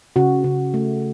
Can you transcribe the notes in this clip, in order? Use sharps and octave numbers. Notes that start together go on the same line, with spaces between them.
C#3 F#4
C#3
A3